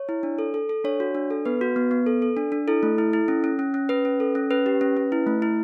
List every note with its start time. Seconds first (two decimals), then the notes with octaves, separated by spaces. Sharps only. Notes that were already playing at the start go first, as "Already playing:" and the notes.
Already playing: C#5
0.09 E4
0.23 D4
0.39 A4
0.54 A4
0.69 A4
0.84 D4 C#5
1.00 F#4
1.15 D4
1.30 A4
1.45 B3 B4
1.61 F#4
1.76 B3
1.91 B3
2.07 A4
2.22 A4
2.37 D4
2.52 D4
2.68 E4 A4
2.83 A3
2.98 E4
3.13 E4
3.28 C#4
3.44 C#4
3.59 C#4
3.74 C#4
3.89 C#4 B4
4.05 C#4
4.20 A4
4.35 C#4
4.51 C#4 B4
4.66 G4
4.81 C#4
4.97 C#4
5.12 E4
5.27 A3
5.42 E4